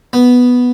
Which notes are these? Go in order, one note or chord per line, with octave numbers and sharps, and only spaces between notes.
B3